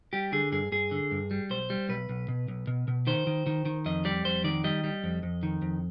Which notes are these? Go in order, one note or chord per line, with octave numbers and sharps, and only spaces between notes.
G3 G4
D3 G#4
G2 G#4
G2 G#4
D3
G2
G3
B1 C5
G3
B1 B4
B1
B2
B1
B2
B2
D#3 C5
D#3
D#3
D#3
F2 D#5
G3 D5
F2 C5
D#3 D5
G3 D#5
G3
F2
F2
D#3
F2